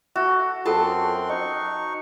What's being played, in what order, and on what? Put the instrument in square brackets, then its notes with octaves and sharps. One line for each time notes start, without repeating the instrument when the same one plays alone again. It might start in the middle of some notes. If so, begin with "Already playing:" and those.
[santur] F#4 [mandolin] A4 [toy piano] E5
[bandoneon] F#2 C4 C6 [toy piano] F4 A4 G5 [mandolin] A5
[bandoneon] D#4 C#6 [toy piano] D#5